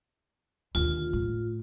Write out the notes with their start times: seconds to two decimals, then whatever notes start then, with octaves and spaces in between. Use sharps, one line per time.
0.75 D#2 D3 F4
1.13 A2